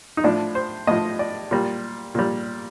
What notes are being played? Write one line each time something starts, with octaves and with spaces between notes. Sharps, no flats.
D#4
A2 F3 D4
C5
A2 F3 D#5
D5
A#2 G3
A#2 G3